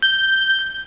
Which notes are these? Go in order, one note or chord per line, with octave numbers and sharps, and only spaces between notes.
G6